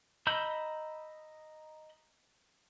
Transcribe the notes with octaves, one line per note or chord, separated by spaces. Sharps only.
D#5 A#5 B5 E6 G6